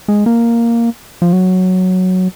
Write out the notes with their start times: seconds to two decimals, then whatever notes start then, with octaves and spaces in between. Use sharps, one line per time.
0.08 G#3
0.26 A#3
1.22 F3
1.33 F#3